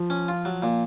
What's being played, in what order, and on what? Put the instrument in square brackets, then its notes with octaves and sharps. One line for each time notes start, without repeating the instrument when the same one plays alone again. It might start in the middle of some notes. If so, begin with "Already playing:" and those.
Already playing: [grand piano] F3
[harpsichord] C#4
F4
F#3
A#2